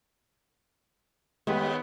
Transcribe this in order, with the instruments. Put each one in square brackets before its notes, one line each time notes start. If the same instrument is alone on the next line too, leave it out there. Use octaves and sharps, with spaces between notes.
[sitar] D#2 [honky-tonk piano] G#3 [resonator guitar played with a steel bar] A3 G4 [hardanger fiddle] B3